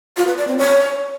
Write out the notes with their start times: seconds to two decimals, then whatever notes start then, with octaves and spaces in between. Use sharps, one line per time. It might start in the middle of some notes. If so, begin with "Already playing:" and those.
0.17 F4
0.27 B4
0.37 D5
0.48 C4
0.58 C#5